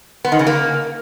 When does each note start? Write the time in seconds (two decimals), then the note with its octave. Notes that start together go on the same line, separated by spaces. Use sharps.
0.25 B3
0.32 D#3
0.39 C#3
0.47 A#3